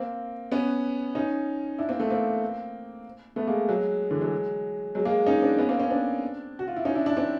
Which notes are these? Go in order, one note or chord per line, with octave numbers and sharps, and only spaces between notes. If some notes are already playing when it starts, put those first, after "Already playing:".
Already playing: A#3 C4
B3 C#4
C#4 D#4
D4 E4
A#3 C4
A3 B3
A#3 C4
A3 B3
G#3 A#3
F#3 G#3
D3 E3
F#3 G#3
F#3 G#3
G#3 A#3
C#4 D#4
C4 D4
B3 C#4
A#3 C4
B3 C#4
C4 D4
F#4
F4
E4
C#4 D#4
D4 E4
D4 E4
C4 D4